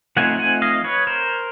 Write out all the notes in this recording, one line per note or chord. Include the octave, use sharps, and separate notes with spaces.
F3 A3 C4 D#4 F#5 G#5
F#5 G#5
D#5 F5
B4 C#5
A#4 C5